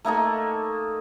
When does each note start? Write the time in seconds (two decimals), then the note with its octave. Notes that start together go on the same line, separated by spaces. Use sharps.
0.05 A3 A#3 D#4 A4